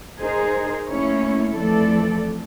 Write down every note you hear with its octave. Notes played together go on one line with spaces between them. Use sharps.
D#4 G#4 A#4 C5
A3 A#3 C#4 E4 C#5
F2 E3 F3 A3 A4 D5